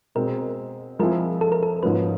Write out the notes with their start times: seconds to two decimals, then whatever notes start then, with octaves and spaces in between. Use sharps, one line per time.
0.15 B2 G#3 C4 A#4
0.99 F3 G#3 C4 E4 G#4 A#4
1.41 A4
1.52 A#4
1.63 A4
1.83 G#2 F3 A#3 C#4 F#4 B4